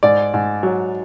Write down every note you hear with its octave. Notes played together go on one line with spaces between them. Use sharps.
G#2 D5
G#2
F#3